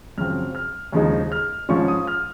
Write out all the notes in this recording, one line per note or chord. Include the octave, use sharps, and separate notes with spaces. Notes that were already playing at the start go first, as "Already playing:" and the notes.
F#2 C#3 F3 C4 F6
F6
D#2 C#3 F3 G#3 D#4
F6
G#2 F3 G#3 C#4 F4 C#6
D#6
F6